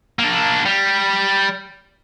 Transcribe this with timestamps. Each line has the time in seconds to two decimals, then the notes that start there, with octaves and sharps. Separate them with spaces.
0.19 A#3 D4
0.65 G3